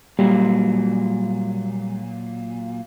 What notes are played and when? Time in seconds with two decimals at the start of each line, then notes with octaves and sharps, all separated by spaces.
0.19 A#2 F#3 G3